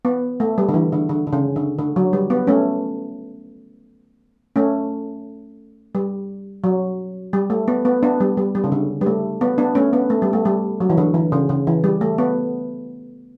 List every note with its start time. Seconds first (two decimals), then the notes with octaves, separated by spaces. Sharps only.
0.05 B3
0.40 A3
0.58 G3
0.69 D3
0.74 E3
0.92 D3
1.09 D3
1.27 D3
1.33 C#3
1.56 D3
1.79 D3
1.96 F#3
2.13 G3
2.30 B3
2.47 A3 C#4
4.56 A3 C#4
5.95 G3
6.64 F#3
7.33 G3
7.50 A3
7.68 B3
7.85 B3
8.03 B3 D4
8.20 G3
8.37 G3
8.55 G3
8.64 C#3
8.72 D3
9.01 G3
9.06 A3
9.41 B3
9.58 B3 D4
9.75 A3 C#4
9.93 B3
10.10 A3
10.22 G3
10.33 A3
10.45 G3
10.80 F#3
10.90 E3
10.98 D3
11.14 E3
11.32 C#3
11.49 C#3
11.67 E3
11.84 G3
12.01 A3
12.18 B3